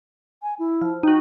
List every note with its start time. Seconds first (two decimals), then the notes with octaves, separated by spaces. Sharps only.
0.42 G#5
0.59 E4
0.81 F3
1.03 D#4 F#4 G5